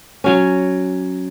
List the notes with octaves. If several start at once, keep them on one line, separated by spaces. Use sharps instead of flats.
F#3 C#4